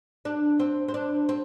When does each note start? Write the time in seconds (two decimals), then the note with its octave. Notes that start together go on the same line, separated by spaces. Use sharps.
0.25 D4
0.60 C4
0.88 C4
0.94 D4
1.29 C4